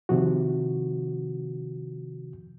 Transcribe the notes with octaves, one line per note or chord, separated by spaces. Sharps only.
C3 D#3 F3 F#4